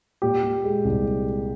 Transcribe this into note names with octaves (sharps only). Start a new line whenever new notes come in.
A#2 G4
A#2
G#3
C2